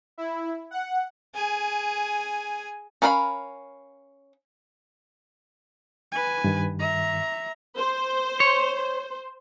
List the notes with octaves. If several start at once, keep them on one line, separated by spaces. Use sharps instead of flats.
E4
F#5
G#4 G#5
C#4 A#4 F5 F#5 B5
B4 G#5
G2 D#3
E5 A#5
C5
C#5